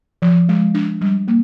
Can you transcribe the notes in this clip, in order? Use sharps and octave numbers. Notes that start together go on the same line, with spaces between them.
F3
G#3
D4
G3
A#3